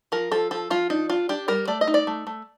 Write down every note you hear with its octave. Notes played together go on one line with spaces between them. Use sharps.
F3 A#4
F3 A4
F3 A4
F3 F4
D4 D#4
D4 F4
D4 G4
G3 A#4
A3 D5
D#5
D#4
D5
A3
A3